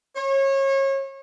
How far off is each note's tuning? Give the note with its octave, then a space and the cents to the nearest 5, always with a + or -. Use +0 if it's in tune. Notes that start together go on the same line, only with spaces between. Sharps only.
C#5 -30